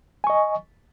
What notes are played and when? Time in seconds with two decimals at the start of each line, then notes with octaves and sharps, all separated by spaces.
0.24 G#5
0.27 C#6
0.30 D#5